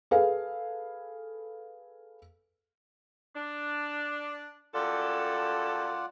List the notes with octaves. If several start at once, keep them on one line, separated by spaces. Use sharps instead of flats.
G#4 A4 B4 F5
D4
F#2 G3 F4 A4 D5 F#5